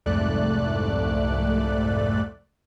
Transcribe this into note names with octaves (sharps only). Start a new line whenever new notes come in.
C2 F2 G#2 A3 D5 F#6